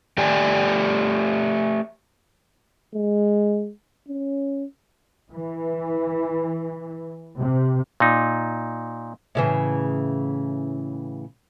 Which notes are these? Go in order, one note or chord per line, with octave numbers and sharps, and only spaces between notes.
A3 G4 D5 G#5
G#3
C#4
E3
C3
A#2 D#4
A2 C#3 E3